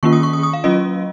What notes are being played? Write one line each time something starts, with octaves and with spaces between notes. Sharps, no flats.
D#3 A#3 C#4 F4 C#6
D#6
C#6
D#6
D#6
F5
F#3 C#4 F4 D#5